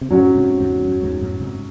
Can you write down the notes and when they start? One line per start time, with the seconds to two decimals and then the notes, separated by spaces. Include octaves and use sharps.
0.01 C3
0.10 F#2 A2 F#3 C#4 F#4
0.35 G#2 C3
0.60 E2 G#2
0.85 F#2
1.03 E2 G#2
1.21 F#2 A2
1.40 G#2 C3